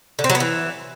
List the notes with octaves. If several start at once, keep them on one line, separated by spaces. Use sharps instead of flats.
D3
C4
F#3
B3
E3